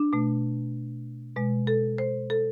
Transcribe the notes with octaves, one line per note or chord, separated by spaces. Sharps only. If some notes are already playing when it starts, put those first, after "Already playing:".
Already playing: D4
B2 A3
B2 G#3
A4
C5
A4